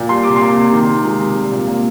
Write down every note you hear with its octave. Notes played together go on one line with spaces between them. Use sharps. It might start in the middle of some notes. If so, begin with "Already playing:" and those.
Already playing: A#2
G3 C6
C3 D6
C6
A#3
C3
D#3
C3
G#3
C3
G3
A#2
A#3